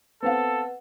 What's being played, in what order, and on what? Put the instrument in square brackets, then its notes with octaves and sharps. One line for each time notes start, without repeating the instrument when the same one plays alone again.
[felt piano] B3 C4 F5 [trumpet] A4 [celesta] B4 F#5